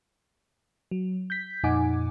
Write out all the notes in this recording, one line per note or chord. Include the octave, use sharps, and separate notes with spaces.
F#3
G6 B6
F2 A#2 D#4 F#5 G#5 D6